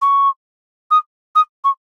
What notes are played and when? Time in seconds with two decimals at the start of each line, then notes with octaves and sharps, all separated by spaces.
0.01 C#6
0.90 D#6
1.35 D#6
1.64 C#6